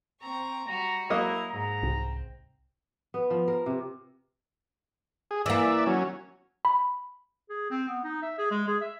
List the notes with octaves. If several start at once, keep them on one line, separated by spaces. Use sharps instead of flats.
C4 A#5 C#6
G3 F#4 A#5
F#3 A#3 E4 D#5 A#5
G#2 A#5
C2 C4
B3
F3
A#4
C3
G#4
E3 A#3 D5 E5
F#3 C#4
B5
G#4
C4
B3
D#4
E5
G#4
G#3
G#4
E5